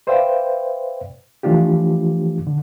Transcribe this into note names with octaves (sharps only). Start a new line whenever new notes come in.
B4 C5 D5 E5 F5 G5
E3 F3 A3 D4 F4 G4
D3